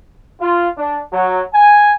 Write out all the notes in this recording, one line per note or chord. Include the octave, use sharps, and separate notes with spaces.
F4
D4
F#3
G#5